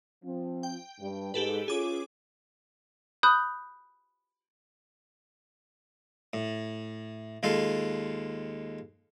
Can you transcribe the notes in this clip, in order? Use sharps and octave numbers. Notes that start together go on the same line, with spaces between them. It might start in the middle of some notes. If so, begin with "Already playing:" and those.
F3 C4
G5
G2
G#2 G4 A4 B4
C#4 F4 G#4 D6
B5 D#6 F#6 G6
A2
D#2 G#3 F4 A4 F5